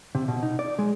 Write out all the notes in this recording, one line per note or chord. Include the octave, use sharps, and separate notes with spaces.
C3
B2
D#4
D5
G#3